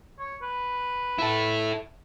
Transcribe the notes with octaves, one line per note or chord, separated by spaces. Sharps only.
C#5
B4
E4 A4